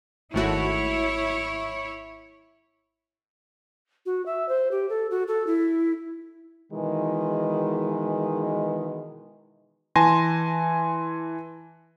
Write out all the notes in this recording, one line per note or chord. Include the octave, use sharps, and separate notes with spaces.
G#1 A3 E4 F#4 C#5
F#4
E5
C5
G4
A4
F#4
A4
E4
B2 D#3 E3 G#3
E3 G#5 A5 C6 A#6